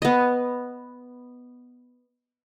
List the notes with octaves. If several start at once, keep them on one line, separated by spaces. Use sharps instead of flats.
B3 D#5